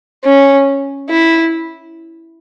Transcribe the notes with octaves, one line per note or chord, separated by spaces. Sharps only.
C#4
E4